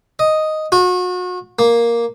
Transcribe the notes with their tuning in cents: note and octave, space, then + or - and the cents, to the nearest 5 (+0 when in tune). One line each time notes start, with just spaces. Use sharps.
D#5 +0
F#4 -35
A#3 +5